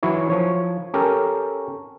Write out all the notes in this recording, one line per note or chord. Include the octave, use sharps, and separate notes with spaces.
E3 F#3 E4 C#5
F3 C#5
C#4 G4 A4 A#4